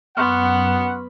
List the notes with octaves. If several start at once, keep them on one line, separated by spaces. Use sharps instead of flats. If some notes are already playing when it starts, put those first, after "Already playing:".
F#2 B3 F#5 C6 C#6 F6